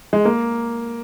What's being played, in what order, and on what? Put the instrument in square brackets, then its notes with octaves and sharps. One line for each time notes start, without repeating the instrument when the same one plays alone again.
[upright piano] G#3
A#3